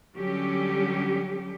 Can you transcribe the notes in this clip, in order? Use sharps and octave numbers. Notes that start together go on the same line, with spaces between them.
D3 F#3 G3 C#4 G4